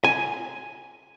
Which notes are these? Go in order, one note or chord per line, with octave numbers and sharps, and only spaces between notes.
G#5